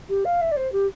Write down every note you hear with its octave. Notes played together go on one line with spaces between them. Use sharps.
G4
F5
E5
D5
C5
G4